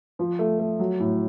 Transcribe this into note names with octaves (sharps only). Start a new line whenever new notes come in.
F3
A3
A3
F#3
A2